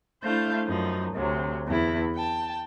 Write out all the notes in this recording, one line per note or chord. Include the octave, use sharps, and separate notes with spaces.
A3 D4 E4 C5 F5 G6
F#2 F3 D#4
D2 C3 F#3
E2 E4
G5 A5